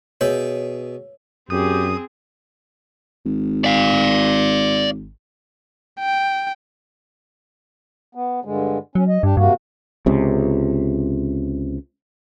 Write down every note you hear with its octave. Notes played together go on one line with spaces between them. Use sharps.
B2 G#4 C#5 E5
F#2 C4 G4 G#4 D#6
G#1
D5 F5
G5
B3
G2 D3 G#3
F#3 C#4
D#5
G2 D4 G4
G2 C3 A#3 F#4
C#2 C3